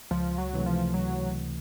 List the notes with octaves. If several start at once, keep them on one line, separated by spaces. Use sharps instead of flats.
C#2 F3
F#3
C3 E3 A3
F3
F#3